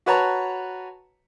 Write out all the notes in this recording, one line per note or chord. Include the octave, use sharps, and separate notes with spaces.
F#4 B4 C#5 A5 A#5